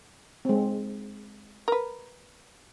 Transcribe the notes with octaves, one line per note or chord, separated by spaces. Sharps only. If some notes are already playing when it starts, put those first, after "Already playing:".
G#3 C4
A#4 B4